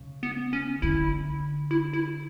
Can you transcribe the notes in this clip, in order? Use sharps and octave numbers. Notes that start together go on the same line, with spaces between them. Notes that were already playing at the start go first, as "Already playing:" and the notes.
Already playing: C#3
B3
C#4
D3 E4
E4
E4